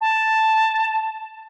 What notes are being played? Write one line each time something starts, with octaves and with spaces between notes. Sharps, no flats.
A5